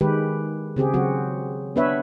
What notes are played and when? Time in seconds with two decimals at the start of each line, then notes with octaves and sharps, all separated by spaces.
0.01 D#3 G#3 G4 B4
0.76 C#3 C4 G4 G#4
0.94 C#3 F#3 C4 F#4
1.76 B3 D4 B4 C#5 E5